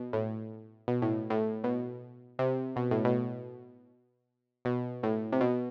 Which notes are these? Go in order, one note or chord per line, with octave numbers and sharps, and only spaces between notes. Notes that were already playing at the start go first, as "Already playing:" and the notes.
Already playing: B2
A2
B2
A2
A2
B2
C3
B2
A2
B2
B2
A2
C3
B2